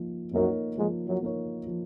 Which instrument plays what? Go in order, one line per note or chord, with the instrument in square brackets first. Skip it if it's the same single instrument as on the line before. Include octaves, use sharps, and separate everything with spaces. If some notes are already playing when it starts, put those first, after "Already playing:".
Already playing: [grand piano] F3 A#3 D#4
[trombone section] F#2 F#3 [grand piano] A#3 D#4 A#4 C#5
[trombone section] G#2 G#3 [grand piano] F3
[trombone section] F#2 F#3
[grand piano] A#3 D#4 A#4 C#5
F3